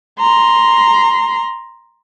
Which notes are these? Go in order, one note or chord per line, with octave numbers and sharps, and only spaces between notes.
A#5 C6